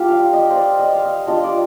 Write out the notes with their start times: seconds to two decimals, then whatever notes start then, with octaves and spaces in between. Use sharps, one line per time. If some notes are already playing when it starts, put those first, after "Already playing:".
Already playing: G3 D4 F4 G4 D5
0.08 F5
0.33 D#5
0.50 C5
0.56 D5
0.79 D#5
0.92 F5
1.03 D#5
1.27 G3 D4 F4 D#5
1.44 D5